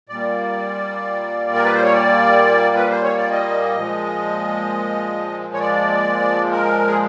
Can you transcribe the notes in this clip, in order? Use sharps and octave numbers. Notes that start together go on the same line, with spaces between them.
A#2 G3 A#3 D5
A#4
B4
C5
C#5
D5
B4
C5
C#5
D5
D#5
A#2 F3 G#3
C#5
D5
A#4
G#4